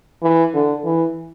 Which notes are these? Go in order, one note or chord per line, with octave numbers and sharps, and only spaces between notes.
E3
D3
E3